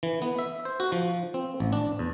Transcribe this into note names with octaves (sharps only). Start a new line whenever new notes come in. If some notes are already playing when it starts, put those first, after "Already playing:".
E3
B3
E5
C5
F#4
F3
C4
A1
D4
E2